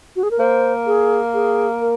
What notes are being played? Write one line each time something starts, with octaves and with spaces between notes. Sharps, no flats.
F#4
G#4
A#4
A#3 C5
G#4
G#4
A#4